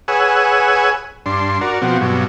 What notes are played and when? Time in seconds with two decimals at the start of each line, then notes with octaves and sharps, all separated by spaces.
0.08 G#4 B4 C#5 F#5 G#5 E6
1.26 G2 D4 C6
1.61 F#4 A#4 D5
1.82 B2 F3 C4 F#4
2.01 G2 B2 F#3